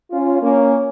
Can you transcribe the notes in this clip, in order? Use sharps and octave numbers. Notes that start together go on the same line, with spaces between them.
C#4 F4
A#3 C#4